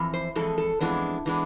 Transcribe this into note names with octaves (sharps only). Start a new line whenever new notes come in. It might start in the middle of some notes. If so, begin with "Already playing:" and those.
Already playing: F2 E3
C5
F2 E3 G#3 A4
A4
F2 E3 G#3 B3 D4
E3 G#3 B3 D4